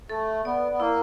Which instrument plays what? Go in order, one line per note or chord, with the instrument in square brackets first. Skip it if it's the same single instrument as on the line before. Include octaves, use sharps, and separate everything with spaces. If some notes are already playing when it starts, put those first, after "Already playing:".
[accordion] A3 [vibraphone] A4
[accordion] B3 [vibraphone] D5
[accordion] B3
[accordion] A#3 [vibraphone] E4